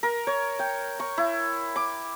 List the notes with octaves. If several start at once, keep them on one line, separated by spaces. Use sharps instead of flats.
A#4
C#5
G5
C#6
E4
D6